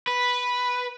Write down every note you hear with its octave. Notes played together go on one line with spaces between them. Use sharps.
B4